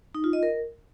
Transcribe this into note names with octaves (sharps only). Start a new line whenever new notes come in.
D#4
F4
D#5
A#4